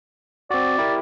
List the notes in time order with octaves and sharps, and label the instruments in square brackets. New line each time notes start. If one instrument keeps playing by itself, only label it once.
[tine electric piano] C4 F#4 [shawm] D5
[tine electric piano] E4 G4 A#4